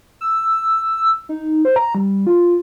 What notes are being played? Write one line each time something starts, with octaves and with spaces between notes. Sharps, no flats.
E6
D#4
C5
A#5
G3
F4